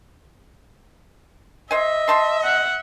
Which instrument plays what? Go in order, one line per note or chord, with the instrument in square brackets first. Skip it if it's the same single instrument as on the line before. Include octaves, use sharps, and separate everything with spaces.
[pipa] C5 G#5 [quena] D#5 [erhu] E5
[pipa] C5 A5 C6
[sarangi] F#5